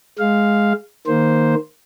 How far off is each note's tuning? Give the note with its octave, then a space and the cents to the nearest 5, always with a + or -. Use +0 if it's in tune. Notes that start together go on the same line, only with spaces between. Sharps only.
G#3 +0 F5 +0
D#3 +0 A#3 +0 C5 +0